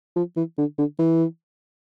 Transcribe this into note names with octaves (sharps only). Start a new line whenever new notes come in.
F3
E3
D3
D3
E3